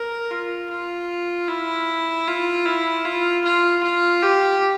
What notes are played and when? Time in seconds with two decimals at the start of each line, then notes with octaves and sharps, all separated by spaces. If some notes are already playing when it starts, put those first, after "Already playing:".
Already playing: A#4
0.31 F4
0.70 F4
1.48 E4
2.27 F4
2.66 E4
3.05 F4
3.45 F4
3.83 F4
4.23 G4